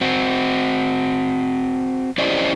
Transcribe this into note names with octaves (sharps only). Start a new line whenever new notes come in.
C4 F#4
C#4 E4 G4 C5 D5 D#5